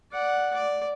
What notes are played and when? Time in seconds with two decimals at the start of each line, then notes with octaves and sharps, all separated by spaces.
0.12 D5 F#5
0.54 D5